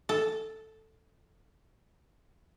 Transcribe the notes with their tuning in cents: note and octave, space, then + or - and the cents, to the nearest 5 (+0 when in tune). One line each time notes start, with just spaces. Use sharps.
A4 +0